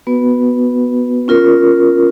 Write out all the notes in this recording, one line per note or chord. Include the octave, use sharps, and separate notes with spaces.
B3 F#4 B4
C#4 F4 A#4